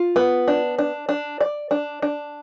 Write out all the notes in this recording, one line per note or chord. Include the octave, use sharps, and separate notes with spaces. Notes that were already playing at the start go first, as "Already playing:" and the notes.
Already playing: F4
B3
D4
D4
D4
D5
D4
D4